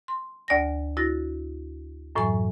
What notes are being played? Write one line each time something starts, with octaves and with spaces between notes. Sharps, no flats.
C6
D2 D5 G#5 A#6
E4 F#4 A6 A#6
F#2 A2 E3 F#3 G#5 C#6